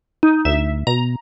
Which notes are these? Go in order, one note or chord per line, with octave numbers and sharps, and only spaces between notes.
D#4
D2 E5
B2 A#5